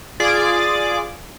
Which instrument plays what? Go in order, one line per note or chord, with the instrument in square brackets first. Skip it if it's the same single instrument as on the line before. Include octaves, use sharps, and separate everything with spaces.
[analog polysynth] F4 G#4 D5 D6